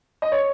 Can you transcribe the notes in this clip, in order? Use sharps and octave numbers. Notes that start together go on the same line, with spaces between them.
D#5
C#5